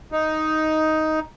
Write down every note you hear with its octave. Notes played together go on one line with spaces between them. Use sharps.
D#4